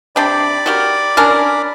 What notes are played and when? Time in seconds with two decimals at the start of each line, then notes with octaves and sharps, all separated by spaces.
0.16 C3 D4 D5 G5 B5 D6
0.66 F#4 G4 A#4
1.17 C#4 D4 A#4